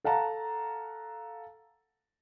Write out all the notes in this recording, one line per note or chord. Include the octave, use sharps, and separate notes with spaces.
A4 F5 F#5 A5 A#5